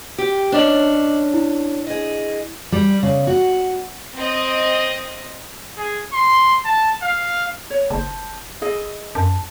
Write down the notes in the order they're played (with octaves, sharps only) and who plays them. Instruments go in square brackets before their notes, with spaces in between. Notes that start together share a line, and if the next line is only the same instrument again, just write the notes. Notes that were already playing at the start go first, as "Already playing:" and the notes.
[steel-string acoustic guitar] G4
[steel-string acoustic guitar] C#4 D4 [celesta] D#5 D6 F#7
[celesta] E4
[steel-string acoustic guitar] G#4 D#5
G3
C#3
F#4
[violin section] C4 D#5
[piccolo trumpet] G#4
C6
A5
F5
[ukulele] C#5
[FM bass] F#1 [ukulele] C5 A5
[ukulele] E4 G#4 D#5
[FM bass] F#2 [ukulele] A5